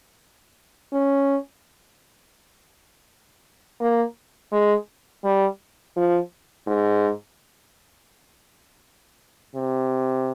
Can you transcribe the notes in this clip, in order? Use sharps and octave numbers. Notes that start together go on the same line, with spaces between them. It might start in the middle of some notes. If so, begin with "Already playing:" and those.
C#4
A#3
G#3
G3
F3
G#2
C3